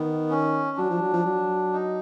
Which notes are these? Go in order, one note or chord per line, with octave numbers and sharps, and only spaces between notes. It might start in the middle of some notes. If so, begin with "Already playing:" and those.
Already playing: D#3 B3
C#4
F#3 D4
F3
F#3
F3
F#3
D#4